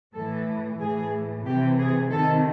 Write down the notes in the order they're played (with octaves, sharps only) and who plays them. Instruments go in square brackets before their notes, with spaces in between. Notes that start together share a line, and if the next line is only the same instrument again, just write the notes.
[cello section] A2 E3 A4
A2 E3 G#4
C3 E3 G4
G#4
C3 D#3 A4